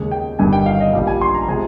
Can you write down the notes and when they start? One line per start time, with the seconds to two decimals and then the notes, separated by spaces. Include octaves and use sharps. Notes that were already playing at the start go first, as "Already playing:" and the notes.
Already playing: D#2 C#3 G#3
0.11 G5
0.39 G1 G2 D#3 G#5
0.53 G5
0.66 F5
0.81 D#5
0.93 A#1 A#2 G3 F5
1.07 G#5
1.21 C6
1.35 A#5
1.48 C3 F3 G#3 G#5